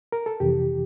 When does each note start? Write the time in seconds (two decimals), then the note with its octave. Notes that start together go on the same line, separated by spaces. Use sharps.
0.12 A#4
0.26 A4
0.40 F2 C3 E3 G4